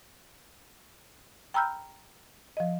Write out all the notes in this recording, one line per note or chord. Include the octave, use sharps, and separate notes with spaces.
G5 A#5 B5 E6 F6 G6
F3 D#5